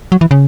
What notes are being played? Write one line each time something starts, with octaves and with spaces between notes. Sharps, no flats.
F#3
E3
C#3